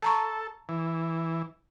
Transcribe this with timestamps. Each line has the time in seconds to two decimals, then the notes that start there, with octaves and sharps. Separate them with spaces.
0.02 A4 A5 A#5 C#6
0.69 E3